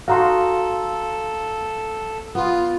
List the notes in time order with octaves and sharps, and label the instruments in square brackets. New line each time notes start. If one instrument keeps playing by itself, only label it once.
[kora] D#4 F#4 [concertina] A4 [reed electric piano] F5 A#5 C6
[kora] B3 [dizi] F4